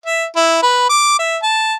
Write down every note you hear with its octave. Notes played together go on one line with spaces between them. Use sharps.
E5
E4
B4
D6
E5
A5